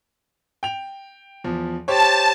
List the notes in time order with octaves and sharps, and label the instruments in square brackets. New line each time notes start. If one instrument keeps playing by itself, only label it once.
[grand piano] G5 F7
E2 F3
[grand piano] G4 C5 C#5 [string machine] A5